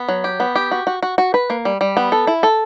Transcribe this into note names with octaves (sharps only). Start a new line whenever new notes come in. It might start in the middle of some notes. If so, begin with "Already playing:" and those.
Already playing: B3
F#3
G4
B3
G4
F#4
F#4
F#4
F#4
B4
A#3
G3
G3
B3
A4
E4
A4